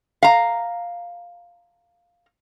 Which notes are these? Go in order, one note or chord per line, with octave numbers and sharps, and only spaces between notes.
F5 A#5